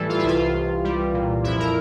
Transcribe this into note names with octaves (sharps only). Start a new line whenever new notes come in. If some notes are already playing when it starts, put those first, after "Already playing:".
Already playing: A2 E3 G3 A4
F4
E4
C2 F4
C2
G3
A#2
F2 E4
A#4